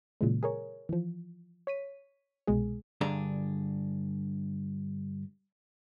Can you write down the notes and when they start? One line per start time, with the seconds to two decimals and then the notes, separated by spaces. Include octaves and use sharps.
0.21 A#2 C#3 E3 G#3
0.43 G#4 A#4 C#5
0.89 E3 F3
1.67 C#5 B6 D#7
2.47 C2 B2 G#3 G#4
3.01 G2 D3 D4 G#4 A#5